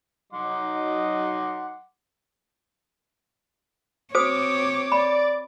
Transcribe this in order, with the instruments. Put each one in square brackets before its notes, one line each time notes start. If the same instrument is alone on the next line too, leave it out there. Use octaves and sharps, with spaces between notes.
[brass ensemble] F#3 D#4 D#5 [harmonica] F#5 C6 D6
[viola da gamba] C4 C#5 [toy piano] F#4 C5 D#6 [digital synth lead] D6
[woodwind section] D5 [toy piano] B5